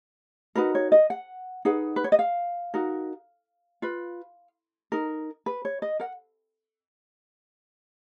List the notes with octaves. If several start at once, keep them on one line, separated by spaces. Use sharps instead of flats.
D#4 F#4 A#4 B4
C#5
D#5
F#5
D#4 G#4 B4 F#5
B4
C#5
D#5
F5
D#4 F#4 A#4
F4 B4
D#4 A#4
B4
C#5
D#5
A#4 F#5